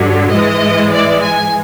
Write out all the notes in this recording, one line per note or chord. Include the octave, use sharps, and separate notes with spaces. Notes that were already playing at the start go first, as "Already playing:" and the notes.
Already playing: G2 D3 F#3
G#2 E3 G#3 D#5
D5
G#5